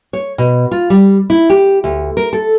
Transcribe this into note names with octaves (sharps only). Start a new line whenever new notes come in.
C#5
B2
F4
G3
E4
G4
D2
A#4
A4